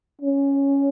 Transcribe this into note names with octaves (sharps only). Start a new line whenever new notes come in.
C#4